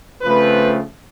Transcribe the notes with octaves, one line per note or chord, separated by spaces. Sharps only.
C#3 F3 A3 C4 B4